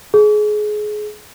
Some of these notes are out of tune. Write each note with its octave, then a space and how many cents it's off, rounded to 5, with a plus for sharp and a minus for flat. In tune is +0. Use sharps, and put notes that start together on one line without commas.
G#4 +25